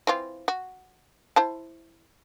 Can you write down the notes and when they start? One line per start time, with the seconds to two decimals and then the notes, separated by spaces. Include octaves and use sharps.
0.07 E3 C4 F4
0.48 F#4
1.36 E4 C5 A5